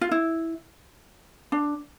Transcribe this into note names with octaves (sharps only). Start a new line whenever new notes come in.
F4
E4
D4